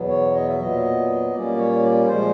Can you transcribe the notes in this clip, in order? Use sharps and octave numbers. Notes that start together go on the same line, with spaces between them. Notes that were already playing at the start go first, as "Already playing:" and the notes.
Already playing: E2 B2 F#3 B3
C#5
D#5
E5
A#2 F#3 B3 D#5
A#2 G3 A#3 C#4 D5
C#5
D5
A#2 F3 G#3 C5